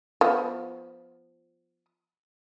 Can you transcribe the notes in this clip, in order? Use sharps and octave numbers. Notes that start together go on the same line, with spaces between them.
F3 B3